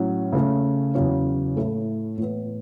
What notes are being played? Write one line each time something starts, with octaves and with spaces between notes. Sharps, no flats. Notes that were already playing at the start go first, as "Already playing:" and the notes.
Already playing: A2 F#3 C#4 F#4
C#3 A3 C#4
E2 C#3 F#3 C#4
A2 A3 E4 A4
A2 E3 B3